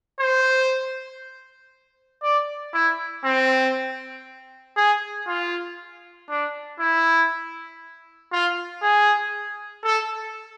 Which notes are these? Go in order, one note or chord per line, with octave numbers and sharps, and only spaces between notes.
C5
D5
E4
C4
G#4
F4
D4
E4
F4
G#4
A4